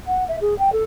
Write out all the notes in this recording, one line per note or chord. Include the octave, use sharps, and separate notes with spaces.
F#5
E5
G#4
G5
A4